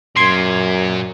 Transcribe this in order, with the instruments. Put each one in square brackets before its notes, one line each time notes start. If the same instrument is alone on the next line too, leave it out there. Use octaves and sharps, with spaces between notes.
[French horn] F#2 [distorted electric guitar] A#2 [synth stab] C6 G#6